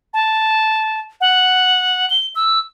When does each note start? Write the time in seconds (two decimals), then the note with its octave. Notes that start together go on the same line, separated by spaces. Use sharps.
0.14 A5
1.21 F#5
2.10 G7
2.35 E6